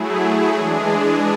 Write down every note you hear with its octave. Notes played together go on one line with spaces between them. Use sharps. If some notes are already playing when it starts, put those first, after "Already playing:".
Already playing: F#3 A3 E4 G#4
E3 G#3 D4 G#4